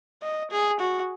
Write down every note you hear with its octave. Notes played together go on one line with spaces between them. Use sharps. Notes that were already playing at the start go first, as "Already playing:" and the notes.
D#5
G#4
F#4